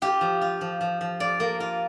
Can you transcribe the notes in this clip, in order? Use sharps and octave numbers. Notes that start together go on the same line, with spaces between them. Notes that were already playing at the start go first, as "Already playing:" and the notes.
F4 G4
F3
F4
F3
F3
F3
F4 D5
A#3
F4